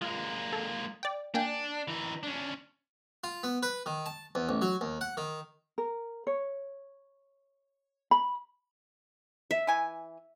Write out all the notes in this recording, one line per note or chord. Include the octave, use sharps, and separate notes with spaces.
G#3 A#3 F4
A4
D5 G5
A#3 D4 G5 G#5
E3 D#4
C#4 D4
F4
B3
B4
D#3
A5
E2
A1
F#3
D#2
F#5
D#3
A#4
C#5
B5
E5
E3 G#5